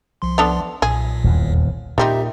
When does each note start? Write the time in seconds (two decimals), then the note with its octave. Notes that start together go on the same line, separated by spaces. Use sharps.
0.22 C2 F3 C6
0.38 B3 D4 A4
0.82 B1 A#2 G#4
1.24 D#1 E2
1.98 A#2 G3 C4 D#4 G4 E5